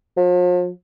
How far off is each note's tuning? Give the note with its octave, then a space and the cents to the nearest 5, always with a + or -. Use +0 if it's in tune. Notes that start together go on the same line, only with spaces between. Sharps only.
F3 +40